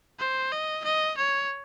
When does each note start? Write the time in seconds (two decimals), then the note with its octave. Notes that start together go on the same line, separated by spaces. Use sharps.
0.19 C5
0.52 D#5
0.84 D#5
1.17 C#5